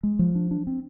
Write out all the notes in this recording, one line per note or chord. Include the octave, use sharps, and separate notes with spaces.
G#3
F3
D4
D4
C4